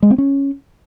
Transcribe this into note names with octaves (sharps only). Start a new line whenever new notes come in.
G#3
C4
C#4